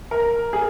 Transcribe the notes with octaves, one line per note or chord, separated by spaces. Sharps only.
A#4
G#4